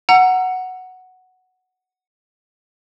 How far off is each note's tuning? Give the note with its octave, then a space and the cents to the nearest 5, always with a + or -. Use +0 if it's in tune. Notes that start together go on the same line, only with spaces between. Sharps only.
F#5 +0 A#5 +0 E6 +35